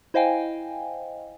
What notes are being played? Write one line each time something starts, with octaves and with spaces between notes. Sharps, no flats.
E4 C5 D#5 F5 G5 G#5